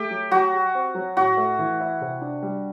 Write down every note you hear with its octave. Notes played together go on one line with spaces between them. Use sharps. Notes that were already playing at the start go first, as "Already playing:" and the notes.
Already playing: A3 G4
F#3
F#3 F#4
G4
C4
F#3
A2 F#4
A3
E3
E4
C3
D4
G3